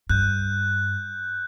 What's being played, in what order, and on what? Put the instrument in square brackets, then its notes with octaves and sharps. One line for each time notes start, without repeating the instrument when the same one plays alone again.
[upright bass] G2 [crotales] F#6 G6